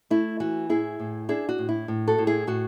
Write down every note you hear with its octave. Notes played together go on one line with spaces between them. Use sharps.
A3 E4
E3 F#4
A2 E4 G#4
A2
D4 E4 G#4
F#4
A2
E4
A2
F#4 A4
A2
E4 G#4
A2 F#4